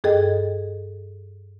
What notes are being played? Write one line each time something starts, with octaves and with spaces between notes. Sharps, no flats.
G2 G#4 A4 D#5 G5